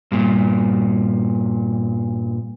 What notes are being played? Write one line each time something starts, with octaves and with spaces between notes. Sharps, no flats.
G2 A#2